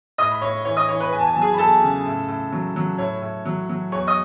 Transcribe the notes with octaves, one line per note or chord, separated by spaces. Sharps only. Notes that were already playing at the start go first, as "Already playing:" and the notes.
A2 D#5 D#6
B5
A2 C#5 C#6
E3 C#5 C#6
D#5 D#6
E3 C#5 C#6
B4 B5
E2 G#5
A5
G#5
F#3 A5
G#4 G#5
B5
E2 A4 A5
C#3
A2
A2
F#3
F#3
A2 C#5
A2
F#3
F#3
E2 C#5 C#6
D#5 D#6